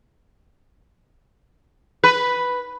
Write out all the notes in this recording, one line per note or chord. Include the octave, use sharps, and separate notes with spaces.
B4